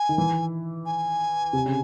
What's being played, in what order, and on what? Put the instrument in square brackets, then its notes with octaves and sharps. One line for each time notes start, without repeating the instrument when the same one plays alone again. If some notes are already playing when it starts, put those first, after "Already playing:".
Already playing: [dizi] G#5
[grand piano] D#3
E3
[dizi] G#5
[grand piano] C3
C#3